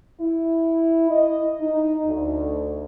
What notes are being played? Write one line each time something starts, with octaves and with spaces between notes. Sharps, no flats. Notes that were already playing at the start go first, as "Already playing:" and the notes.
E4
D#5
D#4
D2